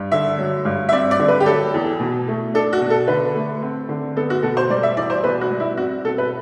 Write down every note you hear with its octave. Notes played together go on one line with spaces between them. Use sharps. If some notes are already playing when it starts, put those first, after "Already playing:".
Already playing: G2
D3 E5
F#3
G2
E5
C4 D5
D5
D3
B4
G4
F#3 A4
E2
B2
A3
D4 A4
F#4
B2
A4
D3 B4
A3
C4
D3
B3 A4
F#4
B2 A4
C5
G3 D5
E5
E2 D5
C5
B2 B4
F#4
G3
E4
C4 F#4
B2 A4
B4